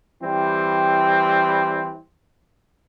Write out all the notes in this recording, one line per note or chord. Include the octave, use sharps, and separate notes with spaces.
E3 G3 C4